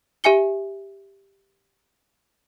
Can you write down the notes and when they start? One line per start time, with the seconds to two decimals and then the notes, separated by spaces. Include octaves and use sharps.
0.24 G4 E5 G#5 C#7 G7